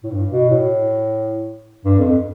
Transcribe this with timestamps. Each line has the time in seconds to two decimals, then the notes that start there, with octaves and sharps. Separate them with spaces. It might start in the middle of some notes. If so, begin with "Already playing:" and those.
0.03 A2
0.11 G2
0.31 B2
0.49 A2
1.85 G2
1.99 F2